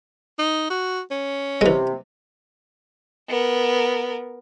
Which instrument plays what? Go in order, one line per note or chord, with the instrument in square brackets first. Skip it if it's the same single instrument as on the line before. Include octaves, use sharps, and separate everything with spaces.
[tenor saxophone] D#4
F#4
C#4
[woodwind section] C3 [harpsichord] E3 G#3
[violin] B3 A#4